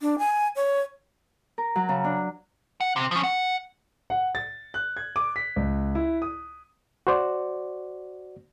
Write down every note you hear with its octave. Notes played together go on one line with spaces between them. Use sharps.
D4
G#5
C#5
A#4
F#3
C#3
D4
F#5
C3
F3 C#4
F#5
F#5
A6
F#6
G#6
D6
B6
C#2
E4
D#6
F#4 C5 D5